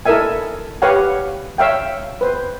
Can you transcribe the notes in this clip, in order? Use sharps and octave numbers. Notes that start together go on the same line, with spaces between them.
E4 A4 A#4 D#5 E5 G#5
G4 B4 C#5 F5 F#5 G#5
C#5 E5 F5 G5
B4 C5